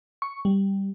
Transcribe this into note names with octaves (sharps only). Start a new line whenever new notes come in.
C#6
G3